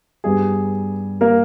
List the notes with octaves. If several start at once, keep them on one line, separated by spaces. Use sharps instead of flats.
G2 G3 B3 G#4
A#3 A#4